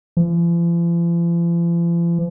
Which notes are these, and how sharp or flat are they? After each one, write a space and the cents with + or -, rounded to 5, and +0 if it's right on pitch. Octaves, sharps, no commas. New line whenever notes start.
F3 -45